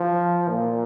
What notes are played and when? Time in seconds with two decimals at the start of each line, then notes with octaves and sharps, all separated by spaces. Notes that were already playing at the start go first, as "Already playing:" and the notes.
Already playing: F3
0.49 A#2